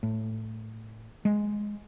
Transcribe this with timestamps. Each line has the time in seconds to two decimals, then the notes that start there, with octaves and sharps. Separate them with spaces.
0.03 A2
1.25 G#3